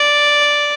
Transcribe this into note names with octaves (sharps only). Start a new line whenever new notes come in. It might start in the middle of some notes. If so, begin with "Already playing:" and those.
Already playing: D5